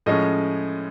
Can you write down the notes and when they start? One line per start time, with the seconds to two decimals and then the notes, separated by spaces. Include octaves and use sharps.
0.06 A2 F3 G#3 C#4 D#5